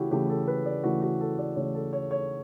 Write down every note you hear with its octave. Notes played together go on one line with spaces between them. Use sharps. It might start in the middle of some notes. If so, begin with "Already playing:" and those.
Already playing: C#3 E3 A3 E4 F#4 G4
C#3 E3 A3 G4
A4
B4
D5
C#3 E3 A3 F#4
F#4
A4
D5
C#3 E3 A3 C#5
A4
C#5
C#5